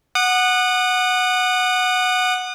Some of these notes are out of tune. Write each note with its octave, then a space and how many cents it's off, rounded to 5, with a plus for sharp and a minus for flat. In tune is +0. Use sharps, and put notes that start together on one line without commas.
F#5 -5 D#6 -35